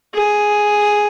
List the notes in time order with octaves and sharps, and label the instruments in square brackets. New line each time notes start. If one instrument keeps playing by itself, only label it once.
[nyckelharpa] G#4